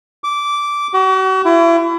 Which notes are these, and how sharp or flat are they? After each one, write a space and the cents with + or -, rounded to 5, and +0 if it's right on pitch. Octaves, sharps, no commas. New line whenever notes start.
D6 -10
F#4 +40
E4 +35